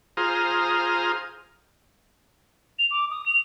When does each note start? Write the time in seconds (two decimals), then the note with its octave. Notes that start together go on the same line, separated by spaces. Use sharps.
0.17 F4 G#4 C5 A#5 D#6 F6
2.79 F7
2.91 D6
3.11 D#6
3.26 F7